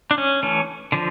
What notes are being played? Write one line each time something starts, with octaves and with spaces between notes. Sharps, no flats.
D4
C#4
E3 A3 C#4
D3 F3